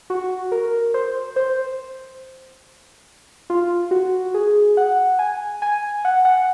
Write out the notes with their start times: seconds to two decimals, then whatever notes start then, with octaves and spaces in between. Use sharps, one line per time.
0.10 F#4
0.52 A#4
0.94 C5
1.36 C5
3.50 F4
3.91 F#4
4.34 G#4
4.77 F#5
5.19 G#5
5.62 G#5
6.05 F#5
6.25 F#5